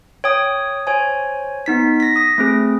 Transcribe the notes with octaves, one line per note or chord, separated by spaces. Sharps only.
C#5 G5 D#6
C5 C#5 G#5
B3 D#4 B6
A#6 B6
D#6 A#6
A3 C4 G#4